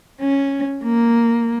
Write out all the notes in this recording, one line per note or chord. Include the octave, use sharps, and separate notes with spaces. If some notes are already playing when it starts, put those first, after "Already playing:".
C#4
A#3